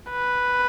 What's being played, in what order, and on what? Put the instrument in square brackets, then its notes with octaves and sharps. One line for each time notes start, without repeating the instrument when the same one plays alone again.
[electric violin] B4